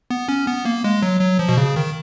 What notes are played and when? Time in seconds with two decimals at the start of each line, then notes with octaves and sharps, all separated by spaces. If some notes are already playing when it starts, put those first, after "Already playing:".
0.10 B3
0.28 C#4
0.47 B3
0.65 A#3
0.84 G#3
1.02 F#3
1.21 F#3
1.39 F3
1.49 B2
1.57 C#3
1.76 D#3